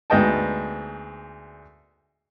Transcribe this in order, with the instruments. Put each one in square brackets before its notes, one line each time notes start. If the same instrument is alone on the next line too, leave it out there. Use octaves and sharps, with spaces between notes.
[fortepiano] D2 G#2 B3 D#5 G5 A5